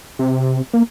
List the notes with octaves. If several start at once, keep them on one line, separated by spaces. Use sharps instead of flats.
C3
A#3